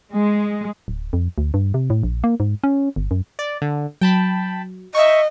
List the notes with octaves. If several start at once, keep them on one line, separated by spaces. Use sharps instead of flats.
G#3
D1
F2
D2
G2
C3
A2
A#1
A#3
G#2
C#4
G1
F#2
D5
D3
F#3 G5 A5 B5
D#5 E5 C#6